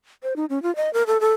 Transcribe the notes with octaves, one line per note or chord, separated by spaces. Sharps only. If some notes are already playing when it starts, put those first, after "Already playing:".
C5
D#4
C#4
F4
D#5
A#4
A4
A4